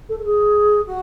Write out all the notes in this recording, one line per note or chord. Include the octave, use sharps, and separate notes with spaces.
A4
A4
G#4
F#4